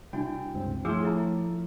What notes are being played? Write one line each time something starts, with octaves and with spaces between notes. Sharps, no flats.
C2 D4 E4 F#4 G5
C#2 G2 C4
A2 F3 G#4 C6 D6 E6
F4 A4 E5 A#5